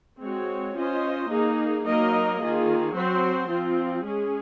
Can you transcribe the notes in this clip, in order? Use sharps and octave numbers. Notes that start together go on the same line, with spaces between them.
G#3 C4 F#4 C#5
C#4 F4 C5 D#5
A#3 D#4 G#4
F#3 A#3 D#4 A#4 D#5
D#3 A#3 F4 G#4
F#3 C4 F#4 C5
F3 C4 F4
G#3 C#4 G#4